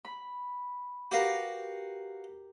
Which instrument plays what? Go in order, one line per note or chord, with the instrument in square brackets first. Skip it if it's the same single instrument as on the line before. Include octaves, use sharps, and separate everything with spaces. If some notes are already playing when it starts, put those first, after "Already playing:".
[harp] B5
[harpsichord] F#4 B4 F5 [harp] G4 A#4